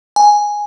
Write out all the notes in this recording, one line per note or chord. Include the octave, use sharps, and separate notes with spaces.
G#5